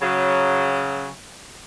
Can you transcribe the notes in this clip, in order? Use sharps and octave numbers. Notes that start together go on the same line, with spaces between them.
C#3 F#3